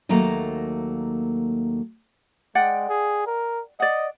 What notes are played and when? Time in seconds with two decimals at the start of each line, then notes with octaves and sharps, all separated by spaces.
0.09 D#2 F#3 A3 A#3 A#5
2.55 G#3 D5 F#5 G5
2.89 G#4
3.26 A#4
3.80 D5 D#5 F#5